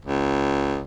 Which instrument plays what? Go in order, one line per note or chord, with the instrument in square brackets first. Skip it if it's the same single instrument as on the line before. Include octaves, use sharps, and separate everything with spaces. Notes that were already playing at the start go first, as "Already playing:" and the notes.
[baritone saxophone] C#2